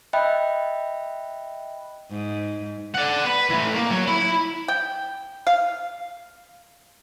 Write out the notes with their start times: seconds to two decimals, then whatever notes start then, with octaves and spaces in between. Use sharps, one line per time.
0.13 D#5 E5 G5 B5 F#6
2.10 G#2
2.95 D5 F#5
3.25 B4
3.50 E3 A3
3.75 A#3
3.90 F#3 C#5
4.07 E4 B5
4.68 G5
5.47 F5